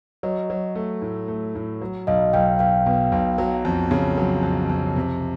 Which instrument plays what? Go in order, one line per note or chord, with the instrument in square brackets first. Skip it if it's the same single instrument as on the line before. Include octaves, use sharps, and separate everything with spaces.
[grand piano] F#3 [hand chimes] C#5 D#5
[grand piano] F#3
A3
A2
A3
A2
F#3
[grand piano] B1 [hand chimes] D#5 F5
[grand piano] B1 [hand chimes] F5 G5
[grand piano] B1 [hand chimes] F5 G5
[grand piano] B2
B1
F#3
F2
C#3
F#3
F2
F2
C3